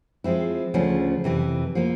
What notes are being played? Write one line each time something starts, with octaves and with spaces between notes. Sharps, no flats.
F3 G#3 C4 E4
D2 C#3 F3 A3 C#4
F2 C3 E3
F3 A#3